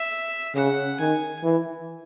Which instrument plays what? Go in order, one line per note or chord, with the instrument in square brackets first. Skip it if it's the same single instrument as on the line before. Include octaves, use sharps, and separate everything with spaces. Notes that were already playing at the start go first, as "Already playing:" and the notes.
Already playing: [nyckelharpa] E5
[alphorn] C#3 [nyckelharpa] F#5
[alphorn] D#3 [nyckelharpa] G#5
[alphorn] E3